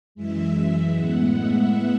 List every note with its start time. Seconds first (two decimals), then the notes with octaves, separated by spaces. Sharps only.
0.15 F#2 E3 G#3 E5
0.96 A2 G#3 B3 F#5
1.38 E5